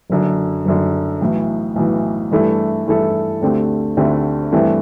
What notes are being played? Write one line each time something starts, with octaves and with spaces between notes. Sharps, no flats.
F#1 F#2 D3
F#1 F#2 D3
B1 A2 E3
B1 A2 E3
G2 E3 A3 E4 A4
G2 E3 A3 E4 A4
D2 D3 A3 C4 G4
D2 D3 A3 C4 G4
G2 E3 A3 C4 E4